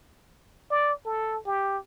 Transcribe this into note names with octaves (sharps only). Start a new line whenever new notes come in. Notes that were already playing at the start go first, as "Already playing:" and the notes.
D5
A4
G4